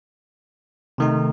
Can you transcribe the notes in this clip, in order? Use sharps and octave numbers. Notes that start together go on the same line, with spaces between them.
C3 D#3 A3 D#4